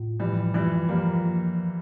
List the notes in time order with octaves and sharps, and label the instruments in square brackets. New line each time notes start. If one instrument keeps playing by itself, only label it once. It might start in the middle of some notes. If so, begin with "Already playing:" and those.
Already playing: [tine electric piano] A2 F4
[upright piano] E3 G3 [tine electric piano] F3
[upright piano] E3 G3 [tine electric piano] F4
[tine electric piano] F3 [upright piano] G3 A#3